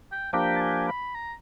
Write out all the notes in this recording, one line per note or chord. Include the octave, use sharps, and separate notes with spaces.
G5
F3 A#3 D4 G4 G5
A5
G#5
B5
A#5